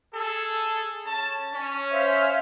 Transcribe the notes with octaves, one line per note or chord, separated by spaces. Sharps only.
G#4 A4
C#4 A5
C#4
C5 E5 F5